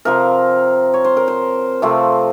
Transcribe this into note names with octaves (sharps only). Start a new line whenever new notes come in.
C3 F3 C4 A#4
C#5
C5
A#4
C5
C3 F3 A3 C4